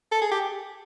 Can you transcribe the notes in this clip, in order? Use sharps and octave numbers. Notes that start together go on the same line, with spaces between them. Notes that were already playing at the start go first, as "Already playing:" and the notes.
A4
G#4
G4